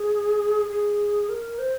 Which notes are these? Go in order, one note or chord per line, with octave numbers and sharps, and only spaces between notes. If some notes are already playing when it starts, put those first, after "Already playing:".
Already playing: G#4
G#4
A#4
C5